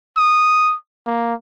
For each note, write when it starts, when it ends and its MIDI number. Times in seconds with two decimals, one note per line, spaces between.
0.17 0.74 87
1.07 1.34 58